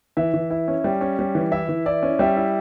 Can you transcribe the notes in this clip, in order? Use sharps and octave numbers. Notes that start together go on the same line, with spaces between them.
E3 E5
E3
E4
C#4
G3
C#4
G3
E3
E4 E5
E3
E4 D5
C#4
G3 E5
E4